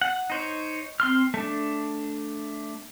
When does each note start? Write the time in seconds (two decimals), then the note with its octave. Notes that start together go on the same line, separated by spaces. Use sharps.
0.02 F#5
0.30 D#4 C5 C#5
1.00 C4 C6 F6
1.34 A3 D4